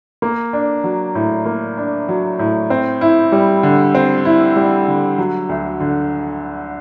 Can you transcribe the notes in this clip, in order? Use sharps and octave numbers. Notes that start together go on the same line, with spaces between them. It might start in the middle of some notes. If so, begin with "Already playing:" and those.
A#3
D4
F#3
A2
A#3
D4
F#3
A2
C4
E4
G3
D3
C4
E4
G3
D3
F#3
D2
D3